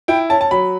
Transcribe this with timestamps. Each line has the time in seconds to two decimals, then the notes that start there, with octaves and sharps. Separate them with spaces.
0.08 E4 G5
0.30 C#4 A5
0.41 A5
0.51 F#3 B5